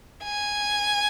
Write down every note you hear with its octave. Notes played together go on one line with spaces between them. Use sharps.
G#5